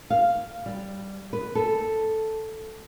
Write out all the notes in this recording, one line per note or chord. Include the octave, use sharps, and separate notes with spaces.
F5
G3
B4
A4